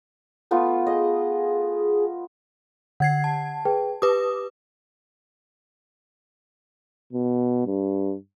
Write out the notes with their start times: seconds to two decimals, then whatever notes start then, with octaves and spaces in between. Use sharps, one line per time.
0.51 A3 B3 F4
0.86 G#4 D#5
3.00 D3 F#5 G#6 C7
3.24 A5
3.65 G#4 B4 G5
4.02 G4 B4 D6 D#6
7.13 B2
7.66 G2